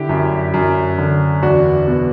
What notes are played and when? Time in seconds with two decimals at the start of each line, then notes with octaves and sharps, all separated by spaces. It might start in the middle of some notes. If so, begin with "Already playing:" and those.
Already playing: D3 E4 G4
0.09 F#2
0.54 F#2
0.99 D3
1.43 E2 D4 F#4
1.87 B2